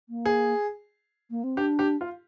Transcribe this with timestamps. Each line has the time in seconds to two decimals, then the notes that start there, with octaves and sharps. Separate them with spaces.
0.09 A#3
0.25 G#4
1.30 A#3
1.44 C4
1.57 D4 G4
1.79 G4
2.01 F4